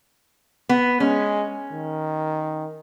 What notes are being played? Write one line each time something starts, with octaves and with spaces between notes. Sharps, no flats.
B3
G#3 C#4
D#3